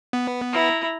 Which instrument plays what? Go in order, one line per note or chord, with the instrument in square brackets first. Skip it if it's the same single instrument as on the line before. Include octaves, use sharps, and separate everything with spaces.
[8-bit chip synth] B3
[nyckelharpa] E4 A#5